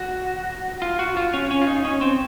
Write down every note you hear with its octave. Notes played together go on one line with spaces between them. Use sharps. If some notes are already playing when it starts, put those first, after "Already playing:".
Already playing: F#4
F4
F#4
F4
C#4
C#4
F4
D#4
C#4
C4